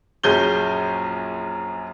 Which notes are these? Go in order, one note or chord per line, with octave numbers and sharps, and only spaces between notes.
A#1 F#2 C#4 G#4 G6 G7